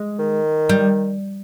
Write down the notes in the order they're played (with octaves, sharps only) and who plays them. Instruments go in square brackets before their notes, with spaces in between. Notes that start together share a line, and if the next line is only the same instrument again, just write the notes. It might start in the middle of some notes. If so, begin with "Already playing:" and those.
Already playing: [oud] G#3
[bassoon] D#3
[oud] G3